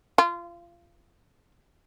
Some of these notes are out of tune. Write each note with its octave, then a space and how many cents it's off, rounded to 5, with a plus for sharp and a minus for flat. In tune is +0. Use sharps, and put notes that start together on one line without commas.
F4 -25